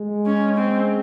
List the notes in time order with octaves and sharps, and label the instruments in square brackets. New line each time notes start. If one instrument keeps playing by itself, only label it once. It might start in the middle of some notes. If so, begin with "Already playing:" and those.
Already playing: [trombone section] G#3
[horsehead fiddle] C#4
C4